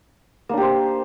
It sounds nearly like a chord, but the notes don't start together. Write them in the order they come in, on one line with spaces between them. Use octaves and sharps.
A#3 D4 G4 C5